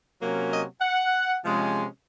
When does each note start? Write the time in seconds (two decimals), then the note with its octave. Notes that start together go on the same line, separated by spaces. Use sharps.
0.21 C3 F#3 A#3 C#4
0.52 D#5
0.82 F#5
1.43 C3 F3 G#3 C#4